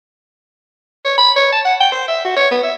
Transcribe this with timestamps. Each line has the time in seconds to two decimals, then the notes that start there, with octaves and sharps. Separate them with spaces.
1.05 C#5
1.18 B5
1.36 C#5
1.52 A5
1.65 F#5
1.80 G5
1.92 C5
2.08 E5
2.25 F#4
2.36 C#5
2.51 B3
2.63 E5